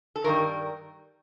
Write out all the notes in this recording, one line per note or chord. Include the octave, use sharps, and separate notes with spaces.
A4
G2 D#3 G3 A#4